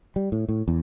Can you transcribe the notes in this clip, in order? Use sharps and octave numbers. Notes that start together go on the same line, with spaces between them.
G3
A2
A2
E2